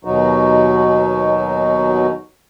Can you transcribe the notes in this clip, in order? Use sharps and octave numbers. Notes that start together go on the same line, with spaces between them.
D#2 B2 F#3 D#4 F#4